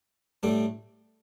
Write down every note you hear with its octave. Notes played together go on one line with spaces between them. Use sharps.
A2 G3 D4